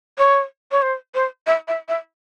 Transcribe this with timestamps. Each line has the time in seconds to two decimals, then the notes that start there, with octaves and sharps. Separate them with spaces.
0.18 C#5
0.71 C#5
0.82 C5
1.15 C5
1.47 E5
1.68 E5
1.89 E5